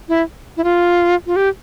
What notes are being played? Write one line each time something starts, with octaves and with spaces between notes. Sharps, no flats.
E4
E4
F4
F4
G4